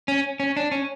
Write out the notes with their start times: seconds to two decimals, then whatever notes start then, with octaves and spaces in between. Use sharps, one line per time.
0.08 C#4
0.40 C#4
0.57 D4
0.72 C#4